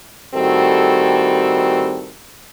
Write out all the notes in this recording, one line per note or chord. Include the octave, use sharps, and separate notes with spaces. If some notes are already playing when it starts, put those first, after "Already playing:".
A2 D#3 G3 C4 F#4 A4